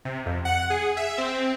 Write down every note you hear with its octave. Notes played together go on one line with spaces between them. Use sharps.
C3
F2
F#5
G#4
E5
C4